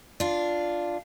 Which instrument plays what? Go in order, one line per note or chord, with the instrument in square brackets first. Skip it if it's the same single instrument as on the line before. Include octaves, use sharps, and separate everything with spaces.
[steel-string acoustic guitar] D4 F4